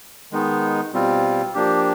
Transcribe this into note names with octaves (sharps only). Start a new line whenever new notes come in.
D#3 G#3 B3 D#4
B2 G3 C4 F4
F3 A#3 D4 G4